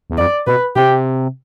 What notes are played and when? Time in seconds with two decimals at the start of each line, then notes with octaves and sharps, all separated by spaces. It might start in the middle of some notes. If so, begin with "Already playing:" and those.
0.10 E2
0.18 F2 D5
0.47 B2 B4
0.76 C3 G4